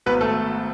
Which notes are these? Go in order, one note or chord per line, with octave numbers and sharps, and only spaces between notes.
G#1 G#2 F#3 B3 B4
A3 A4